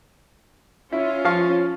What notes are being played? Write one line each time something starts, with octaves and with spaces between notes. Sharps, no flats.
C#4 E4 F4
F3 F5 C#6